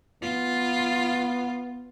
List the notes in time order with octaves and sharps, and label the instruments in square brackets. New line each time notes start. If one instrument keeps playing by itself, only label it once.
[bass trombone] B3 [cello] F4